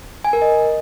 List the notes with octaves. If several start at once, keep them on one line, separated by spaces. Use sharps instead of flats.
G#5
A#4
D#5